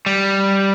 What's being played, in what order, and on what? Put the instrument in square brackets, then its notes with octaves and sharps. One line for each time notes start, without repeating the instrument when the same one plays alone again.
[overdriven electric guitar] G3